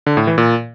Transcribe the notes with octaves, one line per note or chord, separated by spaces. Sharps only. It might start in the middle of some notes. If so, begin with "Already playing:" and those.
D3
A2
E3
A#2